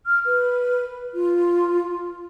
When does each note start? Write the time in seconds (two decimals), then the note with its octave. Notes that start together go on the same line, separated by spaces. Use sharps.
0.06 F6
0.26 B4
1.14 F4